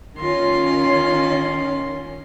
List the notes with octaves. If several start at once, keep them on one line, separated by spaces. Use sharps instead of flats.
D#3 C#4 F4 C6